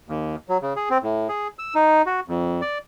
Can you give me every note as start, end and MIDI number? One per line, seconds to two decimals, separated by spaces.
0.09 0.36 39
0.49 0.57 54
0.62 0.73 49
0.76 0.89 68
0.90 0.98 60
1.03 1.28 45
1.29 1.48 68
1.59 1.74 88
1.75 2.02 63
2.06 2.20 66
2.28 2.61 41
2.62 2.78 74